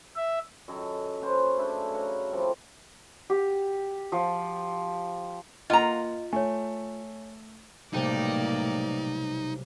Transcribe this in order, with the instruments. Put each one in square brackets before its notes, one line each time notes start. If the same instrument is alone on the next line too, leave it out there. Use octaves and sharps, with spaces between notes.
[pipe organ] E5
[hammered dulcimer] F#2 D#3 A4
C#4 F#4 B4 C5
C#3 A3 D4 E4
A#4 C#5 F#5 A#5
F3 G3 A3 C4
[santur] G4
F3
[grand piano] A#3 F#5 [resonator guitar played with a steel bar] F4 A#5 [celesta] D#5
[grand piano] A3 [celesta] C#5 G#5
[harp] B1 C3 G3 [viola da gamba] A2 A#3 D5 [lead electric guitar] D#4